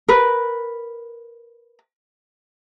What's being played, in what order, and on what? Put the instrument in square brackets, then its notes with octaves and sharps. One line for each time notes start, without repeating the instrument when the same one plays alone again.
[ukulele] A#4 B4